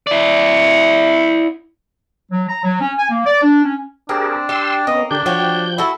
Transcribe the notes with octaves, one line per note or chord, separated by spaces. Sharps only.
E4 D5
F#3
A#5
F#3
C#4
G#5
A#3
D5
D4
C#4
C4 D4 G4 G#4 A#4
G4 C6 E6
A#3 B3 C#4 D#5
D3 D4 G4 G6
F3 F#4 G4 C#5 G6
E4 F#4 A4